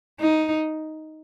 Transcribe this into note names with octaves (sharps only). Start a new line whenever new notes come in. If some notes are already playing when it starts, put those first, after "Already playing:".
D#4